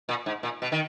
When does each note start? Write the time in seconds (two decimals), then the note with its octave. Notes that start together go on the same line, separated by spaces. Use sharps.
0.09 A#2
0.26 G#2
0.43 A#2
0.62 B2
0.72 D#3